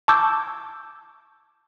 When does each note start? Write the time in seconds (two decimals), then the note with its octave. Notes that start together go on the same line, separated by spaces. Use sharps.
0.08 A5 C#6 D6 E6 G6 G#6